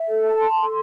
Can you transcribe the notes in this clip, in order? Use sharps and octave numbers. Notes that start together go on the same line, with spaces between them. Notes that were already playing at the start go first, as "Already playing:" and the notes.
Already playing: E5
A4
A5
C6
A4